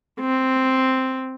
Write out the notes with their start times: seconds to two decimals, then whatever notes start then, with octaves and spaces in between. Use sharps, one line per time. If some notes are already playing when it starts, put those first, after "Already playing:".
0.21 C4